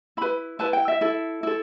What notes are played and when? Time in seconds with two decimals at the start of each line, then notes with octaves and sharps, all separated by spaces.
0.17 E4 B4 B5
0.59 E4 B4 A5
0.73 G5
0.88 E5
1.01 E4 A4
1.43 E4 A4